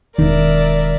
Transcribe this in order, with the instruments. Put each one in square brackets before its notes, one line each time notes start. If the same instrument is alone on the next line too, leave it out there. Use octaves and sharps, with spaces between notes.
[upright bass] E1 [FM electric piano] D#3 [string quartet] A#4 D5 E5